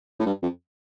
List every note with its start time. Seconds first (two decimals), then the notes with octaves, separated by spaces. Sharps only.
0.20 A2
0.26 G2
0.43 F2